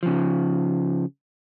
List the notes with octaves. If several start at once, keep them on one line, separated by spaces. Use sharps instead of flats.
C#3 F3